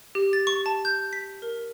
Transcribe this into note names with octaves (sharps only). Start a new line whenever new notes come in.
G4
A6
C#6
A5
G6
B6
A#4